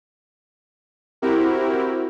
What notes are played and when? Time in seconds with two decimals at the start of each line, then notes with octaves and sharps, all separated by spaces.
1.22 C4 E4 F#4 G4 A#4